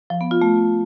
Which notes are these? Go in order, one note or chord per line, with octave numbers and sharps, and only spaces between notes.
F3
B3
F4
A3